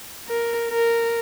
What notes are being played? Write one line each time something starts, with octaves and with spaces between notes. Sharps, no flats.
A#4
A#4